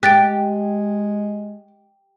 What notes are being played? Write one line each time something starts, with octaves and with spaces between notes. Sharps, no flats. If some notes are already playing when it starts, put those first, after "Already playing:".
G#3 G4 F#6 A6 D7